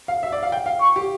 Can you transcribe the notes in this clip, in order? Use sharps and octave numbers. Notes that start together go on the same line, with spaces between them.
F5
E5
D5
F5
G5
F5
C#6
G4